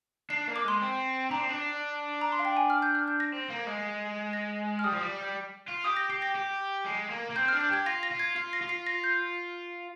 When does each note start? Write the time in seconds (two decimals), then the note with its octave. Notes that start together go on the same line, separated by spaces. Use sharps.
0.30 D4 C7
0.48 A#3
0.56 D6
0.64 G#3 C6
0.81 C4
1.31 D4 A#5
1.39 C4
1.49 D4
2.21 A#5
2.32 C6
2.39 F5
2.45 G5
2.57 G#5
2.70 F6
2.82 G6
2.95 F6
3.08 G6
3.20 A#6
3.32 C4
3.50 A#3
3.67 G#3
4.33 A#6
4.79 F6
4.84 G3 D#6
4.92 F3
5.00 G3
5.68 F4
5.84 G4 D#6
5.97 A#6
6.10 G4 C7
6.22 A#6
6.35 G4
6.85 G#3
7.10 A#3
7.30 A#3
7.36 C4 G6
7.48 F6
7.52 D4
7.61 G6
7.70 G4 G#6
7.86 F4 A#6
8.03 A#6
8.11 F4
8.19 G#6
8.36 F4 C7
8.53 A#6
8.61 F4
8.69 C7
8.87 A#6
9.04 G6